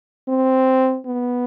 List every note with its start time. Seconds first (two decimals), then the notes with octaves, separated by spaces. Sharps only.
0.29 C4
1.06 B3